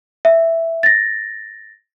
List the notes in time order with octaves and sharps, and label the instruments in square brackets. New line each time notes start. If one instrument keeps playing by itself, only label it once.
[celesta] E5
A6 A#6